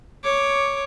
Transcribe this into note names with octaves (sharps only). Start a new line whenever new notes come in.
C#5 D6